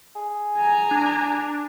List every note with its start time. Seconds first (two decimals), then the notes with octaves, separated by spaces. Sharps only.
0.16 G#4
0.57 G#5 A#5
0.91 D4